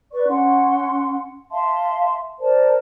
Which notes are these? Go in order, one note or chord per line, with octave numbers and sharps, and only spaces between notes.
B4 D5 C#6
C#4 F#5 C6
E5 F5 A5 C6
A#4 C5 D5 A5